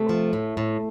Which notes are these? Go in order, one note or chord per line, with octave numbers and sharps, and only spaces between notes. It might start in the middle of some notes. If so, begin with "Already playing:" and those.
Already playing: C3 A3
F3
A2
A2